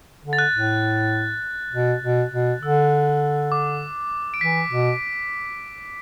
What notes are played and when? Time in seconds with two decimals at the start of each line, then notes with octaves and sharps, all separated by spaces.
0.24 D3
0.33 A6
0.39 F#6
0.53 A2
1.73 B2
2.02 B2
2.32 B2
2.62 D3 E6
3.52 D6
4.34 D7
4.41 E3 B6
4.71 B2